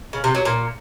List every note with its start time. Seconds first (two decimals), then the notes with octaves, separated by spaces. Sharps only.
0.13 C#3
0.24 C3
0.35 F#3
0.45 A#2